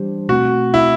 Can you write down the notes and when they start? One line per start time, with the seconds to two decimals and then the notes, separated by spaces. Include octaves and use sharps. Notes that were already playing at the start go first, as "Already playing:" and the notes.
Already playing: E3 G3 D4 G4 C5
0.29 B2 A3 C4 F#4
0.74 E4